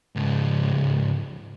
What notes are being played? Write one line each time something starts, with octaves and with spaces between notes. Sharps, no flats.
C#2 G#2